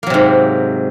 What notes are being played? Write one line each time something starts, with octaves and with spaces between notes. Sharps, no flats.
G#2 C3 F#3 A#3